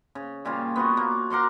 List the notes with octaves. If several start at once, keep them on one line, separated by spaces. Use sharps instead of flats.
C#3
A#2 C#3 G3 F4
B3 F4 F#4
A#3
A#4 F#5 C6 D6